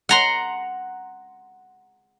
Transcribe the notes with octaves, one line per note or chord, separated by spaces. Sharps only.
F#5 A#5 C6